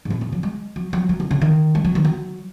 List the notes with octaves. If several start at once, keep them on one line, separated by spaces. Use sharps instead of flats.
G#2
B2
C#3
F#3
G#3
F#3
F#3
F#3
D#3
C#3
D#3
G#3
F#3
D#3
F#3